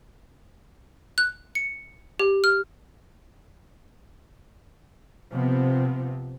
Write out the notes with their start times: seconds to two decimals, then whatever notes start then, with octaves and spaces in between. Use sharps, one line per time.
1.18 F#6
1.55 C#7
2.19 G4
2.44 F6
5.31 C3 F3 B3 C4